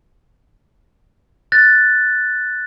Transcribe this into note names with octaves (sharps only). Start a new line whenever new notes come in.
F#6 A6 A#6